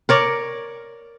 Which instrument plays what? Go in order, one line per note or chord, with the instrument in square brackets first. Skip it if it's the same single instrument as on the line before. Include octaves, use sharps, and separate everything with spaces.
[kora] A#4 C#5 D5